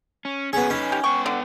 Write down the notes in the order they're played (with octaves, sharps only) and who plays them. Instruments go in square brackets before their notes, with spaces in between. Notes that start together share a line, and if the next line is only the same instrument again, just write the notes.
[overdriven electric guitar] C#4
[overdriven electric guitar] B2 C#4 [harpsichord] B3 G#4
[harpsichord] C#4 [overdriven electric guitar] D#4 B4
[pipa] G4
[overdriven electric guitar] B3 G5 [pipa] C#6
[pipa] D3